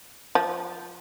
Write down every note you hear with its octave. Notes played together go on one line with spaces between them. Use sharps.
F3